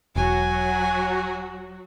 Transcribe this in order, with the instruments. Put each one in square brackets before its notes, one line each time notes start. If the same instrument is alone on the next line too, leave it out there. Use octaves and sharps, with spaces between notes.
[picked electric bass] E1 [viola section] F#3 F#4 [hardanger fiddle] G#5